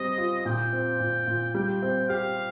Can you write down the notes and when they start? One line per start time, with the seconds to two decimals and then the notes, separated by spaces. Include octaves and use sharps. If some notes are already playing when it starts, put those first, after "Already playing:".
Already playing: G3 C4 D#5
0.18 F4
0.45 A#2 G5
0.73 C4
1.00 A#2
1.27 A#2
1.54 G3 G5
1.82 C4
2.09 G4 F5